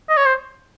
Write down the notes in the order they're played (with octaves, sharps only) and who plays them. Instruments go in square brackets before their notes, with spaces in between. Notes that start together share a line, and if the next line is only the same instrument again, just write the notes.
[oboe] D#5
C#5
C5